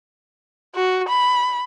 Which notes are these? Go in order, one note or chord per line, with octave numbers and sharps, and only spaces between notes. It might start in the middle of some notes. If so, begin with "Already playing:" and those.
F#4
B5